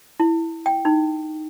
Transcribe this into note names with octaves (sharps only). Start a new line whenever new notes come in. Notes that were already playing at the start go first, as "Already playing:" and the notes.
E4
G5
D#4